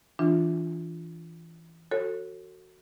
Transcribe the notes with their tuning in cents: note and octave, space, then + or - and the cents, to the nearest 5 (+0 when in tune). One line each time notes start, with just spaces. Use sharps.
E3 +0 D4 +0 F4 +0
F#4 +0 A4 +30 C#5 -25